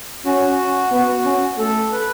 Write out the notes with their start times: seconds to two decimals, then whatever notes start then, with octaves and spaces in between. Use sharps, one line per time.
0.25 C#4 F#4
0.92 B3
1.24 C#4
1.58 A3 A4
1.92 B4